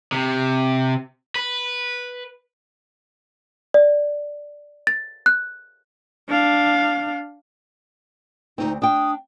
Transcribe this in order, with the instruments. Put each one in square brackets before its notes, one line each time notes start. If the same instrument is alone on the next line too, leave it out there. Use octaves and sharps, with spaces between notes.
[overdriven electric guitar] C3
B4
[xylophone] D5
A6
F#6
[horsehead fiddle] D4 F5
[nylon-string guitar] D2 G2 C4 [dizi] D#4
[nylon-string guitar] D4 G5 [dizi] D#6